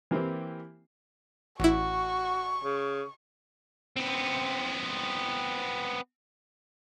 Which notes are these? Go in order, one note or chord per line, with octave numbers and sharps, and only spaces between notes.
E3 A#3 C4 E4 G4
A1 E4 F#4 C#6
C#3
B3 C4